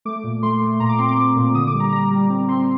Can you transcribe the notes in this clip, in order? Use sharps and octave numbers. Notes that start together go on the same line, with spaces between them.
A3 D6
A#2
A3 C6
A3
A#2 A#5
D6
C4 C6
D6
C4
A#2
D3 D#6
D6
G3
A#5
G3 A#5
G3
C4
C4 C6